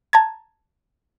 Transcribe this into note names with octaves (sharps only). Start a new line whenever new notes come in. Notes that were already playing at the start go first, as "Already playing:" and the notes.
A5 A#5 G#6